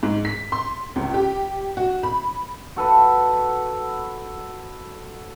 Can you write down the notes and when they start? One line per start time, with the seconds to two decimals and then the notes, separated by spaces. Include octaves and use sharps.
0.03 G#2
0.25 B6
0.52 C6
0.96 C#2
1.14 G4
1.77 F#4
2.03 B5
2.76 F#4 A4 B4